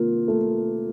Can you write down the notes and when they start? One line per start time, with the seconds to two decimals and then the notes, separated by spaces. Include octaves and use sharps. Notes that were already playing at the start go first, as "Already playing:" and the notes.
Already playing: C3 D#3 A#3 F4
0.28 A3